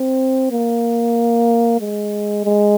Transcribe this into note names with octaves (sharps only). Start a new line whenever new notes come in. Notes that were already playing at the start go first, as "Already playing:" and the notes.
Already playing: C4
A#3
G#3
G#3